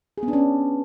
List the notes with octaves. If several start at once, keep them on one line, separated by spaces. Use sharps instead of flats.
G#4
B3
D4
C#4